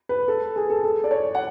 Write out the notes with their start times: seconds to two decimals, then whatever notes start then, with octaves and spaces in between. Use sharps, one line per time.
0.09 B4
0.28 A4
0.56 G#4
0.70 A4
0.84 A4
1.04 D5
1.11 C#5
1.35 F#5